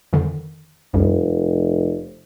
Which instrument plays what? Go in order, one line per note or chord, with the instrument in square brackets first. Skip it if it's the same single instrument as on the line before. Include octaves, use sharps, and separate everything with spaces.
[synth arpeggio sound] F2 D3 D#3
[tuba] F1 [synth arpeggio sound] C2 F#2